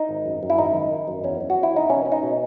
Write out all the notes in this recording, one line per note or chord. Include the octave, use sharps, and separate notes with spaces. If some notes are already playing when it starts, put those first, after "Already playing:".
Already playing: D#4
G#1
F#2
F#2
E4
G#1 D#4
D#3
D#3
F#2
E2 C#4
C#4
F#4
E2
E4
C#4 D#4
B2 C#4
C#4
D#4
B2